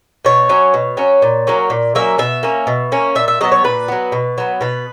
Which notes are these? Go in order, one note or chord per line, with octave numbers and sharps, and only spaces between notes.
B2 C#5
F#3 C#4
B2
F#3 C#4
A#2
F#3 A#3 C#4
A#2
F#3 A#3 C#4 E5
B2 E5
A#3 C#4
B2
A#3 C#4
A#2 E5
E5
F#3 B3 D#5
C#5
A#2 B4
F#3 B3
B2
F#3 B3
B2 B4